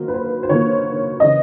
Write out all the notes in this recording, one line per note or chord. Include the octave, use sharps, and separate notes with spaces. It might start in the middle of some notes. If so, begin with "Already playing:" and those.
Already playing: D#3 F#3 A#3 C5
B4
C5
C5
D#3 F#3 A#3 C#5
C#3 E3 D#5